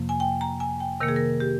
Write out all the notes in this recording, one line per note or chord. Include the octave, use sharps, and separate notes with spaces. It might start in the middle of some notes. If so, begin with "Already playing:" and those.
Already playing: F2 C3 F3 A#3
G#5
G5
A#5
G#5
G5
C3 D#3 A#3 A#4
G#4
A#4
G4